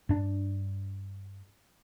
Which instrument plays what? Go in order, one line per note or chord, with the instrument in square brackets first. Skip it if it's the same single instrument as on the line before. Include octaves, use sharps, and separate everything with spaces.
[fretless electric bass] G2 D4